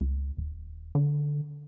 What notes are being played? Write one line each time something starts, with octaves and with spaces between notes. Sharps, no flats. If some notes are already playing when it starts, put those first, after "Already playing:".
C#2
D#1
D3